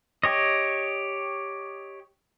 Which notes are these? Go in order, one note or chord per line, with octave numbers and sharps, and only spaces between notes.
G4 C#5 D#5